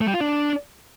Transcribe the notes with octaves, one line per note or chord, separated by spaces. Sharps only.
A3
G3
F4
D4